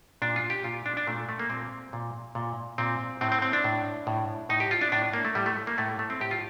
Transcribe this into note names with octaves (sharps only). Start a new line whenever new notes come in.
A#2 D4
F4
G4
A#2 F4
D4
D4
A#2 A3
A3
A#3
A#2 C4
A#2
A#2
A#2 C4
A2 C4
C4
C4
D4
A2
A2
A2 D#4
G4
F4
D4
A2 D4
A#3
A3
A2 G3
A3
A#3
A2 A3
A3
C4
A2 G4
F4